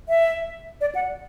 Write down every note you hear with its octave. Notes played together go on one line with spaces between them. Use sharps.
E5
D5
F#5